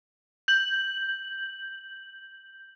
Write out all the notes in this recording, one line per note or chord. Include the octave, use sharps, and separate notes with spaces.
G6 F#7